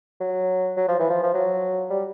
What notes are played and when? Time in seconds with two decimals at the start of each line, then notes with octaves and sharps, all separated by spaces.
0.20 F#3
0.77 F#3
0.88 F3
0.99 E3
1.10 F3
1.23 F3
1.34 F#3
1.90 G3